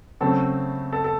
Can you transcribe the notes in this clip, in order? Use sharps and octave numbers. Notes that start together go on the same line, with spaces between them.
C#3 F#3 A3 C4 A4
A4
A4